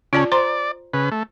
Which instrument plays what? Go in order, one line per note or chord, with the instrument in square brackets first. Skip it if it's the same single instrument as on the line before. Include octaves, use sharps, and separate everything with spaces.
[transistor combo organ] C#3 C#4 [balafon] F4 D5 A5
[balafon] C5 A#5 C6 [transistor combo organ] D5
[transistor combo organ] C#3 B4
A3